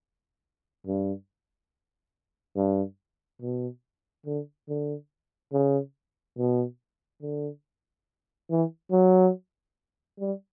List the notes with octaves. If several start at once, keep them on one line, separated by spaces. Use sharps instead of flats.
G2
G2
B2
D3
D3
C#3
B2
D3
E3
F#3
G3